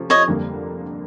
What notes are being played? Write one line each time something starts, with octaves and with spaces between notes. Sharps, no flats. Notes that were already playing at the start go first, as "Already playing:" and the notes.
Already playing: C3 F3 A3 C#4 F4
C#5 D#5
F2 D3 G3 A#3